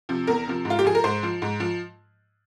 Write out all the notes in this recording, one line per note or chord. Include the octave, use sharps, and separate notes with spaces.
C3 F3
E2 A#4
C3 F3
G#2
F4
G4
F3 G#4
A#4
G#2 C5
F3
G#2
F3